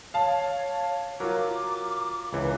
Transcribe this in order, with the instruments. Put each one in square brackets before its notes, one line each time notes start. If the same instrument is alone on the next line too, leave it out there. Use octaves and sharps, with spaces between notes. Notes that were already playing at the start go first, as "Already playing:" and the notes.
[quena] C#5 [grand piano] F5 A5
[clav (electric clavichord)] F#3 [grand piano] F4 A#4 [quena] D6
[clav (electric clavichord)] C#2 E3